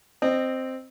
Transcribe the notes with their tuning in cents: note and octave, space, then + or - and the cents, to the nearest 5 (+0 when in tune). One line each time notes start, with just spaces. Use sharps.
C4 +0 D#5 -20